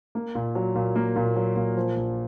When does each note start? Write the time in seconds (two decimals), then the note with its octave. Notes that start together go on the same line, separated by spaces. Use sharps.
0.15 A#3
0.35 A#2
0.55 F#3
0.75 A#2
0.96 A#3
1.16 A#2
1.36 F#3
1.56 A#2
1.76 F3
1.96 A#1